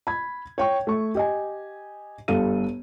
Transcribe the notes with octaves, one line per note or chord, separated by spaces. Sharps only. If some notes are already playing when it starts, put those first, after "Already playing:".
B5 G#6
C#5 G5 C#6
A3 C#6
G4 D#5 G#5
G1 G2 A4 F5 D#7